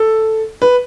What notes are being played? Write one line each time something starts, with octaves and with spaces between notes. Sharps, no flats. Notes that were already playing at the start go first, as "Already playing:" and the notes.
Already playing: A4
B4